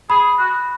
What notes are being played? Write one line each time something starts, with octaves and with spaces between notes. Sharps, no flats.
G#4 B5
F#4